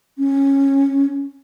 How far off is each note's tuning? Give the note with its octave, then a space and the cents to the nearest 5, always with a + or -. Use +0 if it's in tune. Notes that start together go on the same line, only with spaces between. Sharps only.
C#4 -10